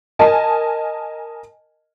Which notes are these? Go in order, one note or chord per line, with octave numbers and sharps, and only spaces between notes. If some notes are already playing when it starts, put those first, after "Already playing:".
A#4 D#5 G#5 A5